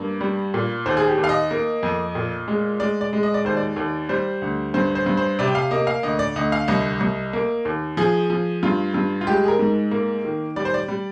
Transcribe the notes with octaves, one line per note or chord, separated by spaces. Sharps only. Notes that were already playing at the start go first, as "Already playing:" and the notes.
Already playing: G2 A#3
G3
A#2
D#2 C5
G#4
G4
D#2
F5
D#5
A#3
F2
A#2
G#3
G#3 D5
D5
G#3
D#5
D5
D#2 C5
D5
D#2
G3 C5
D2
G2 C5
C5
G2
C5
C3 D5
G5
F5
A#3 D#5
F5
D2 D#5
D5
D2 D#5
F5
C2 D#5
C2
A#3
D#2
F3 G#4
F3
G2 F4
G2
F4
G#3 G4
G#4
A#4
G#2
A#3
D#3
G3 D5
C5
D5
G3